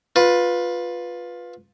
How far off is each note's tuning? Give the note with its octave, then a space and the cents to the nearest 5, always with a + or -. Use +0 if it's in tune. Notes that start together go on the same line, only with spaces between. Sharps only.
F4 +15 B4 +0